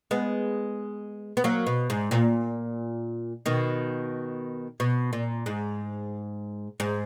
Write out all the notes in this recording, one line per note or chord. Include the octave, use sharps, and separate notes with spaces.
G#3 B3
B3
F#3 A#3
B2
G#2
A#2
B2 D#3
B2
A#2
G#2
G#2